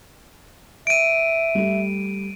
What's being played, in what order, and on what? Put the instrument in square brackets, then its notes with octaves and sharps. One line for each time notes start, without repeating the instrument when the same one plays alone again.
[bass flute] E5 [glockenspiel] D7 D#7
[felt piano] G3 A3 G4